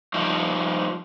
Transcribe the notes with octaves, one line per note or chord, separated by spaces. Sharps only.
F3 G3 D#4